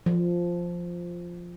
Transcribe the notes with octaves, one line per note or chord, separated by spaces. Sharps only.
F3